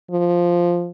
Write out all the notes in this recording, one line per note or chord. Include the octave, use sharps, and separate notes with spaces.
F3